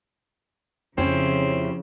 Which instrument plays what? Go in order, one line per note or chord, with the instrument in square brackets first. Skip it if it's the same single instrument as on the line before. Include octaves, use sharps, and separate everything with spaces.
[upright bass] F2 [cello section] C#3 F3 [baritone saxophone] C4 [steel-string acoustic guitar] C#4 E4 G4